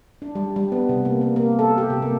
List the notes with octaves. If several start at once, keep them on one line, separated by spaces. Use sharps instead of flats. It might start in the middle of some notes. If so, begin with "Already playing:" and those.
D4
G3
G3
B3
C3
A#3
A#3
A#3
A4
G4
C3
A#3